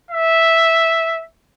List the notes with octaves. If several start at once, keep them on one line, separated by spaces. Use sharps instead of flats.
E5